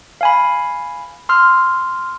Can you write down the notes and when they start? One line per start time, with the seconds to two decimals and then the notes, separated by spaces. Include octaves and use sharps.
0.21 F5 G#5 B5
1.29 C6 E6 F6